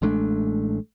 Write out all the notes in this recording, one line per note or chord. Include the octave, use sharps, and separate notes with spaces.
A1 G#3 A3 D4